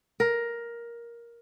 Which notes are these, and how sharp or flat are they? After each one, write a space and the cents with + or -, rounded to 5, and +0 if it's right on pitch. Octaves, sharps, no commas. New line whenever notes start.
A#4 +10